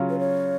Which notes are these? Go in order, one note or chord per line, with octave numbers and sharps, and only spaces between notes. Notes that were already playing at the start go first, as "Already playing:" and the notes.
Already playing: C#3 F#3 C#4 F4
B4
C#5